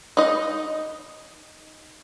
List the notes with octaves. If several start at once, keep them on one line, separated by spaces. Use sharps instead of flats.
D#4 D#5